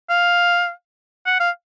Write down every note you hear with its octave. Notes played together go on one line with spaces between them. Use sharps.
F5
F#5
F5